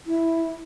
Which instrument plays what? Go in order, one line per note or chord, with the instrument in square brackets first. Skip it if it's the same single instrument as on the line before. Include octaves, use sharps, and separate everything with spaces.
[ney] E4